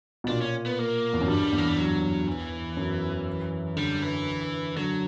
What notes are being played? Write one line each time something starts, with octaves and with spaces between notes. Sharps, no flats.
B2
A#2 D4
C#4
B3
A#3
E2
F#2
G2 G3
E2
A#3
G3
F#3
E3
F#2
D3 G3
E3
D3 F#3